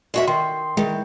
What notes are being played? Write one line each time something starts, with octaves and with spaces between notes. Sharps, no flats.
G#3 F#4 E5
D#3 C6
D#3 E3 G#3